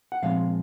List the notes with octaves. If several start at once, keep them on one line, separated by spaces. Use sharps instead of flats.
F#5
A#2 F3 G#3 C4 F5